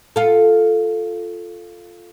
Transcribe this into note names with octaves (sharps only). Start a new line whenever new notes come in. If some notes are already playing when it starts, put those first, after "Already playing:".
F4 A4